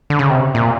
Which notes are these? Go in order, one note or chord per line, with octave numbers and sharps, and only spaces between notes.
D3
C#3
C3
A#2